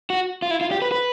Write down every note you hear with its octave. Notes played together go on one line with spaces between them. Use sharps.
F#4
F4
E4
F4
G4
B4
B4